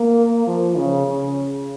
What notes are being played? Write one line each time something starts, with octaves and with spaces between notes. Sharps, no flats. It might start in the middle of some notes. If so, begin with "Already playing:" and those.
Already playing: A#3
F3
C#3
C#3